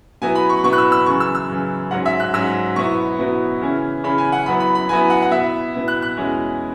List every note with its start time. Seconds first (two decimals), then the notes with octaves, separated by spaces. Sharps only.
0.22 B2 F#3 B3 E4 G#5
0.35 B5
0.50 C#6
0.63 B2 F#3 B3 E4 C#6
0.73 F#6
0.78 E6
0.92 E6
1.06 F#2 C#3 E3 C#6
1.20 E6
1.35 E6
1.49 F#2 C#3 E3
1.91 G#2 F#3 C#4 F#5
2.06 E5
2.20 F#6
2.34 G#2 F#3 C#4 E6
2.76 B2 F#3 B3 E4 C#6
3.19 B2 F#3 B3 E4
3.61 C#3 E3 C#4 E4
4.04 C#3 E3 C#4 E4 B5
4.18 G#5
4.32 F#5
4.46 F#2 F#3 B3 E4 B5
4.60 B5
4.75 B5
4.89 F#2 F#3 B3 E4 G#5
5.10 F#5
5.22 F#5
5.31 B2 B3 E4 E5
5.74 B2 B3 E4
5.88 F#6
6.02 F#6
6.17 E2 B2 G#3 C#4 E4